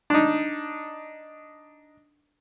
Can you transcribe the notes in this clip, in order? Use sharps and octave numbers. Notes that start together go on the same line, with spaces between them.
D4 D#4